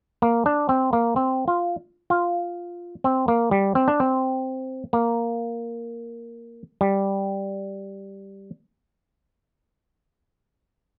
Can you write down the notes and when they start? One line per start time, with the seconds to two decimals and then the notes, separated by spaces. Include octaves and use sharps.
0.22 A#3
0.46 D4
0.69 C4
0.93 A#3
1.16 C4
1.48 F4
2.10 F4
3.04 C4
3.28 A#3
3.51 G3
3.75 C4
3.88 D4
4.00 C4
4.93 A#3
6.81 G3